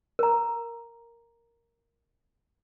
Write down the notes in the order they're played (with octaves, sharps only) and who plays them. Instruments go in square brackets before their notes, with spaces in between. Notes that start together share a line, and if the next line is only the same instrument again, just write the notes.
[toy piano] A#4 A#5